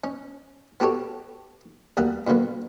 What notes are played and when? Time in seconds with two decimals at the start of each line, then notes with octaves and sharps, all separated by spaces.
0.04 C#4
0.80 B3 F#4 G4 A4 C#5
1.97 D2 G3 A#3 F#5
2.27 A#2 D3 F#3 A#3 B3